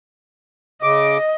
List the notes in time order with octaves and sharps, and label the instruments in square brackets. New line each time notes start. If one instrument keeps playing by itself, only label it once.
[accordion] C#3 D6 [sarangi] D#5